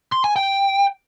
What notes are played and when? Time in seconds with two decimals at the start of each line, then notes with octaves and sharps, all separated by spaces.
0.12 C6
0.24 G#5
0.36 G5